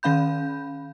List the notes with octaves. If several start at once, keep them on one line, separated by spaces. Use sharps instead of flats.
D#3 C#4 F5 B5 G6